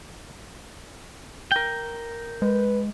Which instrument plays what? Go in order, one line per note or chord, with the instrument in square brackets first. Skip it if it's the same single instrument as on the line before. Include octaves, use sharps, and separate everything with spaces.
[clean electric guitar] A#4 G5
[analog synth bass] G#3 [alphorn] B4